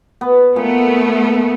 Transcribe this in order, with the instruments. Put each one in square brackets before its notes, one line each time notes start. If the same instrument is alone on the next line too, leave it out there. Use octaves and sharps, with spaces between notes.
[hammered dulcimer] B3
[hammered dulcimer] A#2 [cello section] A3 B3